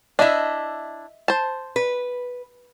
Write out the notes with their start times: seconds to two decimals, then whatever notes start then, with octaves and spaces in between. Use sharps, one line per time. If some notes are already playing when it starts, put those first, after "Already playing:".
0.19 D4 E4 D#5 E5
1.28 C5 A5
1.76 B4